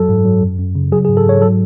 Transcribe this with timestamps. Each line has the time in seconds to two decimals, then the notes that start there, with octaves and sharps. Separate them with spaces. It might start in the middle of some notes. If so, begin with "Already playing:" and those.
Already playing: F#2 F#3 A4
0.09 G#2
0.25 F#3
0.41 F#2
0.58 F#2
0.75 C#3
0.92 F#3 G#4
1.05 G#4
1.09 G#2
1.17 A4
1.25 G#2 C#5
1.42 F#3 A4